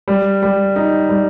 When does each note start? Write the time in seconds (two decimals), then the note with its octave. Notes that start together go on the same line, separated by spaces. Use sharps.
0.08 G3
0.43 G3
0.76 D#4
1.09 G3